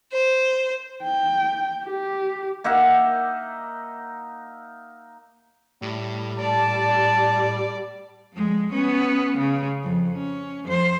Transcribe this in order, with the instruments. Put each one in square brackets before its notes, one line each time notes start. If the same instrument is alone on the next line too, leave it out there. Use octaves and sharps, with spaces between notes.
[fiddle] C5
[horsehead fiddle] G5
G4
[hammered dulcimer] A#3 D#4 E5 F#5
[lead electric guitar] A2 [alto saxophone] G3
[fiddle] D5 [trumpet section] A5
[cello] F2 G#3
B3 C#4
C#3
F2
C#4
F2 C5